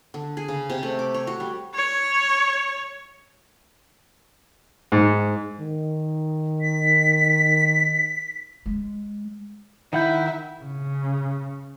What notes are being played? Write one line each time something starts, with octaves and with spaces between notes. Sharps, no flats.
D3
G#4
C#3
C3
A3
D6
C#5
F#4
G3
C#5
G#2
D#3
B6
G#3
D#3 E4 F#5 G6
C#3